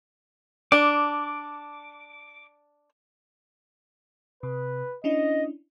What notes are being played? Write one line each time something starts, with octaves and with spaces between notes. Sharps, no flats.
D4 D6
C3 B4
C#4 D4 E4 D#5